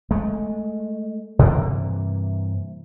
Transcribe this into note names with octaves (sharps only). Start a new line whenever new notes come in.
G#3 A3
G2 C3 E3 A#3